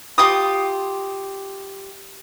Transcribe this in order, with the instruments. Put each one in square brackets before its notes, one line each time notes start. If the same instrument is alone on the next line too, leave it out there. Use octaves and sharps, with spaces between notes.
[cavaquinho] F4 G4 D6 D#6